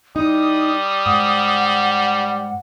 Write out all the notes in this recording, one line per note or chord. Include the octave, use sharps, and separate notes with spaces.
G3 D#4 D#6
G#2 F#5